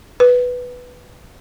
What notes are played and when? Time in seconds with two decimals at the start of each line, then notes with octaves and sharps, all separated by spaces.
0.20 B4